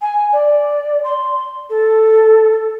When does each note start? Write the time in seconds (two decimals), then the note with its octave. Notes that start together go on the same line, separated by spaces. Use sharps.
0.01 G#5
0.33 D5
1.04 C6
1.69 A4